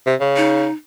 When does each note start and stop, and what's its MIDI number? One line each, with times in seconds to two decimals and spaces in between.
0.06 0.15 48
0.21 0.66 49
0.36 0.72 63